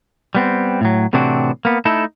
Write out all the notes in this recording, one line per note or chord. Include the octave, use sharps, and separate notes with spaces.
G3 B3 C4
A2 F#3
A2 C3 E3 C4 D4 F#4
A#3 B3
A3 D#4 E4 A4